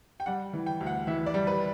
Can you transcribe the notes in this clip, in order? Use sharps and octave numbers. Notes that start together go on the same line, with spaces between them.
G5
G3 F#5
E3
G5
D2
F#5
E3 E5
D5
G3
B4